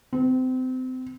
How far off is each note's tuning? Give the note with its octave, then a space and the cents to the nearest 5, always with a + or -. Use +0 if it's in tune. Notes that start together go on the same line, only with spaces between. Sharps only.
C4 -30